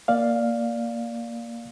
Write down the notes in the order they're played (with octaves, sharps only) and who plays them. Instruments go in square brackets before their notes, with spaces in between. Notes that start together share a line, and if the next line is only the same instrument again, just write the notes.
[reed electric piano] A#3 D5 F5